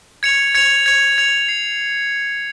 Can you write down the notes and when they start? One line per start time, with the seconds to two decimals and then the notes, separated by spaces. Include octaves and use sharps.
0.23 G#6 C#7 F7
0.55 G#6 C#7 F7
0.86 G#6 C#7 F7
1.18 G#6 C#7 F7
1.48 C7